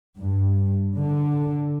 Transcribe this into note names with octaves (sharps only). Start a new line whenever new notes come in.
G2
D3